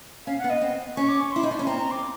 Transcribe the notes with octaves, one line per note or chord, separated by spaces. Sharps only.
C#4 F5
F#5
B3
D#5
C4
C#4 C#6
D6
C#6
E4 C6
D#4
D4
C#4
C4 A#5
A#5
D6